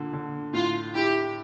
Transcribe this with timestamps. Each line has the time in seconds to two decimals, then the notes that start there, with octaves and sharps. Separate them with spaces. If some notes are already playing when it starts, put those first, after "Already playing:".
Already playing: A#2 D3
0.13 D3
0.53 A2 F4
0.95 E4 G4